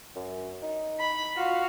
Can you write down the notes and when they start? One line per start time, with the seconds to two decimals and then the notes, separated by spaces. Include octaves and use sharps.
0.16 F#2
0.62 D#4
1.00 B5
1.37 F4 F#4 F5